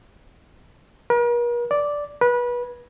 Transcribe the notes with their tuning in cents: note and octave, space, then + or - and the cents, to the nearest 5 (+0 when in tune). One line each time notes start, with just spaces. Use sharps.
A#4 +45
D5 -5
B4 -25